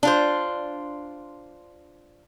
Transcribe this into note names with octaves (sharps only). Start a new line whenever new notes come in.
D4 F4 C5